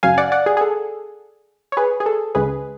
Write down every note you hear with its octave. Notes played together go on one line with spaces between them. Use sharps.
F#2 C#3 F#3 F5 G#5
D5 F#5
D5 F#5
G#4
G#4
A4
C#5
G#4 B4
G#4
A4
C#2 C#3 G#3 G#4 B4